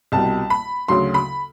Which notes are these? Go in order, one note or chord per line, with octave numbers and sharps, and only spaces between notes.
C2 B2 G3 A5
B5
D2 C#3 F#3 C6
B5